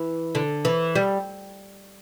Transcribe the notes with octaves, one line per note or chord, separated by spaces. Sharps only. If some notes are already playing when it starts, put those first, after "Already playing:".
Already playing: E3
D3
E3
G3